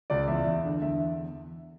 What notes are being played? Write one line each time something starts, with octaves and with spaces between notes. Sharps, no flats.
C#2 D5
E2 E5
E2
D3
E2 E5